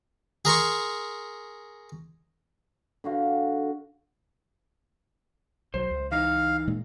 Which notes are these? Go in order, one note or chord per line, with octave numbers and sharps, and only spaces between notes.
G#4 A#4 C6 C#6
D3 F#4 F5
B1 F#3 C5
C#2
E3 D#4 F5
A#2 G#3 A#3